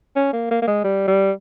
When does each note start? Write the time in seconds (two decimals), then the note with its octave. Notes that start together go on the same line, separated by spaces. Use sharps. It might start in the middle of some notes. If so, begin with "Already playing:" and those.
0.16 C#4
0.33 A#3
0.51 A#3
0.62 A#3
0.67 G#3
0.84 G3
1.08 G3